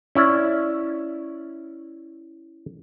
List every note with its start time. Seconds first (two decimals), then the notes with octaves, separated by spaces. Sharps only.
0.15 C#4 E4 D5